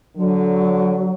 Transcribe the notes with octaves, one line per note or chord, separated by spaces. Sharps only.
D3 F#3